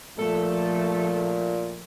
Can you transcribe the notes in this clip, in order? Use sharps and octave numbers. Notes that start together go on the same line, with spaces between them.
A#2 F3 A3 A4